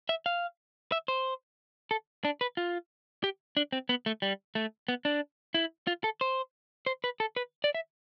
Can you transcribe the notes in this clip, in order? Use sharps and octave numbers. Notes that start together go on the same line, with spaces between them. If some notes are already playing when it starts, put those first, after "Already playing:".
E5
F5
E5
C5
A4
D4
B4
F4
G4
D4
C4
B3
A3
G3
A3
B3
D4
E4
F4
A4
C5
C5
B4
A4
B4
D5
E5